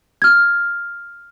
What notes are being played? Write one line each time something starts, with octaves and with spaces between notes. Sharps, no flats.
F6 G#6